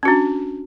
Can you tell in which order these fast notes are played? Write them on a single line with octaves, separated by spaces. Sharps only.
C#4 F#4 D4